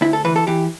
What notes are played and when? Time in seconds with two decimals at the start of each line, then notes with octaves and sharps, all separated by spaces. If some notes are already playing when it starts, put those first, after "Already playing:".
0.01 D2 E4
0.13 A4
0.25 E3 B4
0.36 A4
0.47 E3 G4